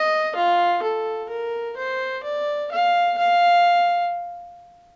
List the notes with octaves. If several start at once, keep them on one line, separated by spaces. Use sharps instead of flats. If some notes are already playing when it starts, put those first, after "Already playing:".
Already playing: D#5
F4
A4
A#4
C5
D5
F5
F5